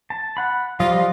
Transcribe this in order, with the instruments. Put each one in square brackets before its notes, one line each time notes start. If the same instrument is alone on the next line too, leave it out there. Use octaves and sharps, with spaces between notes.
[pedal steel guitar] A5
F#5 B5
[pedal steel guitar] F3 G3 D#5 [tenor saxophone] F4